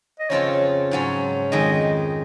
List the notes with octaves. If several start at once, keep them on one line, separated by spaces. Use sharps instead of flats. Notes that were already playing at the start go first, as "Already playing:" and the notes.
D#5
F2 C#3 F3 C4 F4 C#5
G#2 F#3 C#4
F2 D#3 G#3 D#5